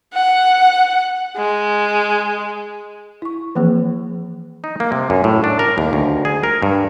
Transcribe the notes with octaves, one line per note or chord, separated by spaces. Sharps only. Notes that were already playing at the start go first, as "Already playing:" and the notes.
F#5
G#3
E4 C#6
E3 F3 A#3 C4 G#4
D#4
A#3
C3
F#2
A2
D4
A#4
D#2
D2
G#4
A#4
G2